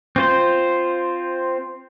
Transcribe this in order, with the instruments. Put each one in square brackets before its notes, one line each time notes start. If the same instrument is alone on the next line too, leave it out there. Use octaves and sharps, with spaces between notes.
[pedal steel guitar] C4 F4 C5